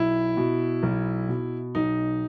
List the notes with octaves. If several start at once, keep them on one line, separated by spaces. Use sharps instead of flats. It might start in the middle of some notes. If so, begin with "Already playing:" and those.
Already playing: B1 E4
B2
B1
B2
B1 D#4